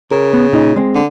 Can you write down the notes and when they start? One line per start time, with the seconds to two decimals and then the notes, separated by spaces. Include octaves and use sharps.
0.11 C#3 A#4
0.33 B3
0.52 A#2 D#4 D#5
0.76 G#3 C4
0.94 D3